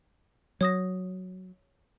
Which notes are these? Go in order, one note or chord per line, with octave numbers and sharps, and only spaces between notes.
F#3 C#5 D#6 A#6